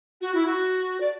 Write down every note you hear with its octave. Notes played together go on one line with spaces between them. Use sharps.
F#4
E4
F#4
D5